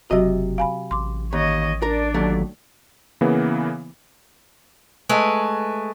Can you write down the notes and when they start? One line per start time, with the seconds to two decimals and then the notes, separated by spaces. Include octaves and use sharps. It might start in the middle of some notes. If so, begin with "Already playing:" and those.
0.11 F#1 C3 F#3 F#4 D#5
0.58 F5 G#5 B5
0.91 A1 C6 D6
1.33 D#2 C#5 D#5
1.82 D4 A#4 D5
2.14 D#2 F#3 A3
3.21 C#3 E3 A#3 B3
5.09 G#3 A3 B4